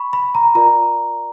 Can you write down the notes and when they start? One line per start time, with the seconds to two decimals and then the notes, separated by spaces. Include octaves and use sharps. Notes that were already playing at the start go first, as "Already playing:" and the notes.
Already playing: B5 C#6
0.13 B5
0.35 A#5
0.55 F4 A#4 D5 A#5